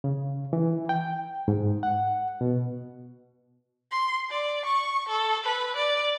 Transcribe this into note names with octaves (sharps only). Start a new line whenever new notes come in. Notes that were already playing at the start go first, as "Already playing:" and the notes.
C#3
E3
G5
G#2
F#5
B2
C6
D5
C#6
A4
B4
D5